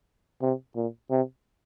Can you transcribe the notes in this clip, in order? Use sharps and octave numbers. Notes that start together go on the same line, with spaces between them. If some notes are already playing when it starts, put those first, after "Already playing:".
C3
A#2
C3